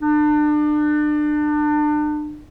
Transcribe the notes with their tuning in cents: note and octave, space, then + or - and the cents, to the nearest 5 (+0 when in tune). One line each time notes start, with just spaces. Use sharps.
D4 +35